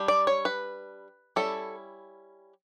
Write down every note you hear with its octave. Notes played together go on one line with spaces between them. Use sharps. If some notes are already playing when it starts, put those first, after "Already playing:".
Already playing: G3 D4
D5
C#5
B4
G3 C#4 E4 A4